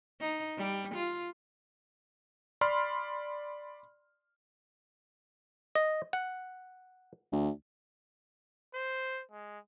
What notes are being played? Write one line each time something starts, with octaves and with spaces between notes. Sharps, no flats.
D#4
G3
F4
D5 B5 C6 F6
D#5
F#5
D2
C5
G#3